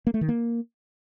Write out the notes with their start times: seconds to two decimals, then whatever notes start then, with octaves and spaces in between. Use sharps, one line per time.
0.07 A#3
0.14 A3
0.21 D#3
0.29 A#3